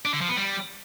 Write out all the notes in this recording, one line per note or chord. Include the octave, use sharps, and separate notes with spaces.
D4
D3
F3
B3
G3